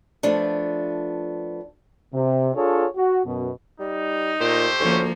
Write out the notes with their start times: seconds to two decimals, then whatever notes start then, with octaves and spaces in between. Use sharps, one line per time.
0.23 F3 A3 B3 D4
2.14 C3
2.55 D4 F4 G#4 A4 C#5
2.96 F#4
3.26 F#2 B2
3.80 G3 D#4
4.40 A#2 A3 G4 C5
4.80 D2 F3 A#3 C#4